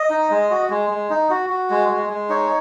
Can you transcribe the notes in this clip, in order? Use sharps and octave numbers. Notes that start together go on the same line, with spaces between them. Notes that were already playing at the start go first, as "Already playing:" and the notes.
Already playing: D#5
D#4
G#3
F#4
G#3
G#3
D#4
F#4
F#4
G#3
G#3
G#3
D#4 C#5